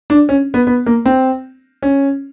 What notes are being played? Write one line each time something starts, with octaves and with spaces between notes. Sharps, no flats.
D4
C#4
B3
B3
A#3
C4
C#4